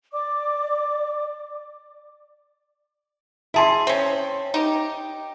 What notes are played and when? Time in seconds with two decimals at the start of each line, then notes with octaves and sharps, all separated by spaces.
0.12 D5 D6
3.54 E4 G#4 E5 A5 C6
3.87 C4 C#4
4.54 D#4 G4